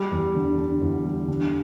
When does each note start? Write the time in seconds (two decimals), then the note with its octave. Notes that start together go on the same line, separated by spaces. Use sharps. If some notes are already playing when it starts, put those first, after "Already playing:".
Already playing: G3
0.11 E2
0.35 D3
0.58 D3
0.82 E2
1.05 G3
1.28 D3